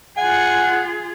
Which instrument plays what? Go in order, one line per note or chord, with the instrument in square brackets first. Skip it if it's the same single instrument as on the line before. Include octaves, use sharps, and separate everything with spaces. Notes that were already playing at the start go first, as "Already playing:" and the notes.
[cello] F4 G#4 [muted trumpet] F#5 [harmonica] G#5